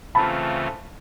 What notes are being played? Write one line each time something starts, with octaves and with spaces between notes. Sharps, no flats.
C#3 E3 A3 C4 F4 A5 B5